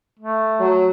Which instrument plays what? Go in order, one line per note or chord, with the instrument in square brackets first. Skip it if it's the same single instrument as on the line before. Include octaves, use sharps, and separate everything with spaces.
[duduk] A3
[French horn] F#3